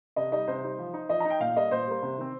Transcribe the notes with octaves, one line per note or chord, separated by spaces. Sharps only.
C3 D#5
G3 D#4 D#5
C3 C5
G3 D#4
F3
D#4
F3 D#5
D#4 A#5
G5
A#2 F5
G3 A#3 D#5
A#2 C5
G3 A#3
C3
D#3 C4